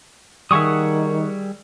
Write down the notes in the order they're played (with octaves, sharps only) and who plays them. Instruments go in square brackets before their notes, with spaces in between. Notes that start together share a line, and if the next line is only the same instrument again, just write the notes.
[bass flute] D#3 [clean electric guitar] G3 G#4 E5 [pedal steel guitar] F#5 C#6 D#6